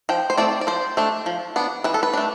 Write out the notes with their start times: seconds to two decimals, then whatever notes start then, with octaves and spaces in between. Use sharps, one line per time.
0.09 F3 G5
0.30 C5
0.37 A3 C4 D5
0.61 D5
0.67 F3 C5
0.97 A3 D4
1.26 F3
1.56 B3 D4
1.84 E3 B4
1.94 A4
2.03 B4
2.13 A3 D4